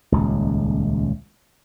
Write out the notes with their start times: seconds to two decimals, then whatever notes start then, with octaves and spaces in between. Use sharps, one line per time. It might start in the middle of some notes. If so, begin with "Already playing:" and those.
0.12 D#1 C#2